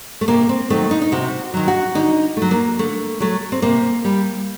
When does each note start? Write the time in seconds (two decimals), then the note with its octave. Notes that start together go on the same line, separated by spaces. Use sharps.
0.21 A3
0.28 C3 A#3
0.49 C4
0.70 D#3 F#3 A3
0.91 D#4
1.02 D#4
1.12 C3 F#4
1.54 D#3 F#3
1.68 F#4
1.95 D3 D#4
2.37 A3
2.42 F#3
2.51 A#3
2.79 D3 A3
3.20 F#3 A3
3.52 C4
3.62 C3 A#3
4.04 G3